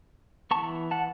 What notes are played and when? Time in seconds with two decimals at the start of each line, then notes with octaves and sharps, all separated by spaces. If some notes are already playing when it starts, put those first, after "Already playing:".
0.51 E3 B3 A5 C#6
0.91 F#5 A5